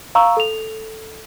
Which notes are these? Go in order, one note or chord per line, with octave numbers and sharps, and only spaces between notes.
F5 A#5 C#6 E6
A4 F7